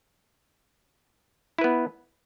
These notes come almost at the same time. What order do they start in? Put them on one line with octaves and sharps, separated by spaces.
E4 B4 B3